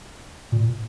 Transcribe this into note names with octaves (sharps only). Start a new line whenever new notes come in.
A#2